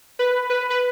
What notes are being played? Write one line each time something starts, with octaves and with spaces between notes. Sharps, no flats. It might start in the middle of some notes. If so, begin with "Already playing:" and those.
B4
B4
B4